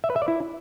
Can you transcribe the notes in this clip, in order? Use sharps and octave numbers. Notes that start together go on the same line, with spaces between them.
E5
B4
E5
D5
E4